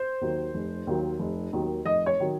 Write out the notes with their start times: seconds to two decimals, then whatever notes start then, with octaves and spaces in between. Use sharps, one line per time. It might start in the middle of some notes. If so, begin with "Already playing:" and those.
Already playing: C5
0.21 D#2 D#3 F#3
0.54 F1
0.87 D#2 D#3 F#3
1.19 F1
1.53 D#2 D#3 F#3
1.86 F1 D#5
2.06 C#5
2.20 D#3 F#3